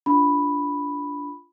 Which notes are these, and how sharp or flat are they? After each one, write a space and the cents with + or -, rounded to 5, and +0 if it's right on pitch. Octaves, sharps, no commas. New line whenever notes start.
D4 -20 F4 -10 B5 +0